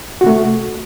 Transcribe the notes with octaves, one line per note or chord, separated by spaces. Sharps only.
C3 A3 F#4